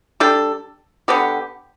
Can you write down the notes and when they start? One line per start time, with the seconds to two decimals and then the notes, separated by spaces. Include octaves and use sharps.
0.20 G3 D4 A4
1.08 D3 B3 G4